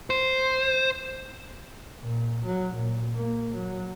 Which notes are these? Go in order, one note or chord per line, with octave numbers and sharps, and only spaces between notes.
C5
A#2
F#3
A#2
A#3
F#3